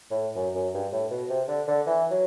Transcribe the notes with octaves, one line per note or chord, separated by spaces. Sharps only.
A2
F#2
F#2
G2
A2
B2
C3
D3
D3
E3
F#3